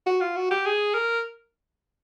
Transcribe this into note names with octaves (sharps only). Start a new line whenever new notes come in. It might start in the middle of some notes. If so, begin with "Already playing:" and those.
F#4
F4
F#4
G4
G#4
A#4